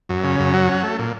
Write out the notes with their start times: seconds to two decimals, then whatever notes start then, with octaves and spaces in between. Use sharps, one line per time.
0.09 F#2
0.24 C#3
0.39 F#2
0.54 F#3
0.69 C#4
0.83 A3
0.99 A#2